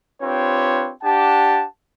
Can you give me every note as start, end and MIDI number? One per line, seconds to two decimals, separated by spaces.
0.22 0.92 60
0.22 0.92 62
0.22 0.92 65
0.22 0.92 67
0.22 0.92 71
0.22 0.92 73
1.03 1.65 62
1.03 1.65 67
1.03 1.65 78
1.03 1.65 81